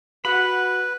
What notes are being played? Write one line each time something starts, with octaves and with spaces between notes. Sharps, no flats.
F#4 B4 F#5 B5